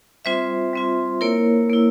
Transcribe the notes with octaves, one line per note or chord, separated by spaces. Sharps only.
G3 C4 F4 C5 E5
G3 C4 F4
A#3 E4 A#4 C#5
A#3 E4